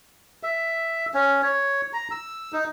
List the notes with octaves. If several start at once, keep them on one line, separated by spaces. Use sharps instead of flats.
E5
C#4
C#5
A#5
E6
D#4